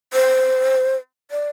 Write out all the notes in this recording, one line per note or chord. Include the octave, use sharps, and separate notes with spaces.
C5
D5